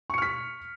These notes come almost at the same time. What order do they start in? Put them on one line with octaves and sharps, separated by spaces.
C#6 C#7 F6 B6